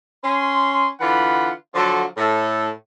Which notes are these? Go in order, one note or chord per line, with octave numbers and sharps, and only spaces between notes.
C#4 C6
D3 E3 F4 F#5 B5
D3 F3 F#3 F4 F#4 A4
A2 A4